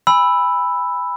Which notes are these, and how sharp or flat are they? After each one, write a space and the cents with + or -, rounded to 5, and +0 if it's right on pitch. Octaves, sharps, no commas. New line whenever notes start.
G#5 -30 B5 +0 E6 +0